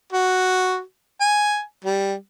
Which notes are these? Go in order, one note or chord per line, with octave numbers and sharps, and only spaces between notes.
F#4
G#5
G3